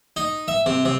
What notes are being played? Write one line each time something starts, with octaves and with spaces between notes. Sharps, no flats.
D#4
E5
C3
C3